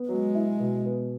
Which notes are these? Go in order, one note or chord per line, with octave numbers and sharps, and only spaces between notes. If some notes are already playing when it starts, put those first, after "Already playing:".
Already playing: B3
F#3 G#3
E4
B2
B3